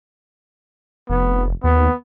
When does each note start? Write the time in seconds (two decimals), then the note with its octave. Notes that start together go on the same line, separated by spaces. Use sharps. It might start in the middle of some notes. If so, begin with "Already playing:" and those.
1.09 F1 B3
1.64 D#2 B3